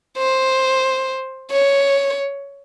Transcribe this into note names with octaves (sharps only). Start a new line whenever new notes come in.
C5
C#5